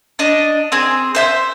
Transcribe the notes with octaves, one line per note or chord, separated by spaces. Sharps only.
D4 D#5
C4 G#4
C5 E5 G6